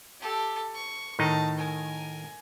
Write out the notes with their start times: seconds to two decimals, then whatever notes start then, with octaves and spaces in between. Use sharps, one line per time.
0.20 G4 A4
0.74 C#6
1.19 A2 D#3 D#4 A5 A#5
1.58 A#4 G#5